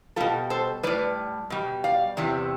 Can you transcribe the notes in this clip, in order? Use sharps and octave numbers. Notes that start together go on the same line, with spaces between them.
B2 G3 F4 A4
A4 C5
A2 G3 B4 D5
B2 G3
D5 F5
E2 C3 E3 G3